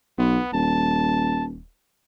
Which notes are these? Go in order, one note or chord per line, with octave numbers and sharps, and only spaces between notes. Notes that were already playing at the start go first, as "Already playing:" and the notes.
B1 B3
D#1 A5